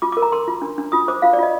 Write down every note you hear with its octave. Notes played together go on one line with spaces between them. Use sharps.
F4 D6
D6
A#4
A#5
A#4 C6
F4
D4
D4
F4 D#6
C5 D6
F4 F5
D5
F4 D#5